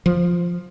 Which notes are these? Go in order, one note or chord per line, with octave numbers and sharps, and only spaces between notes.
F3